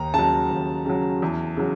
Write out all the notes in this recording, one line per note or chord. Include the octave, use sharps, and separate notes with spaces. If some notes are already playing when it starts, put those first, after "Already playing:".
Already playing: D#2 A#5
C#3 F#3 A5
D#2
C#3 F#3
E2
C#3 F#3